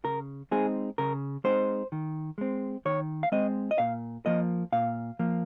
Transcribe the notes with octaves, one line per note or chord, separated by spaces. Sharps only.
C#3 A#4
G#3 C4 D#4 G#4
C#3 A#4
G#3 C4 D#4 C5
D#3
G#3 C4
D#3 C#5
F5
G#3 C4 D#5
D#5
A#2 F5
F3 A#3 D#5
A#2 F5
F3 A#3